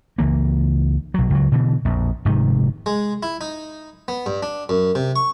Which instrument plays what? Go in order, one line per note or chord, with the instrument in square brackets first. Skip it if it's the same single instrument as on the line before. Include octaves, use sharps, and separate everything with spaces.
[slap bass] C#2 E3 A#3
B1 F#3
C#2 F#3
B2 D3 E3
A#1 F2
F1 G#2 C3 D#3
[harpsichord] G#3
E4
D#4
B3
G2
D4
F#2
C3
C#6